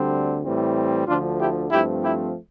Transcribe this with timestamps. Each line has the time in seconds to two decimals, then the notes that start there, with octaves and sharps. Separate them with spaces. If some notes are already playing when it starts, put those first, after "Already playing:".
Already playing: D2 D3 G3 C4
0.43 A2 E3 G3 C4
1.07 D2 D3 F3 D4 F4
1.40 E4 G4
1.71 G2 F3 A3 C4 E4 G4
2.03 E4 G4